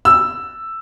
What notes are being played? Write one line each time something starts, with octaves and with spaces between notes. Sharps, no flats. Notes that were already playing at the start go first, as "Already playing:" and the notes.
E6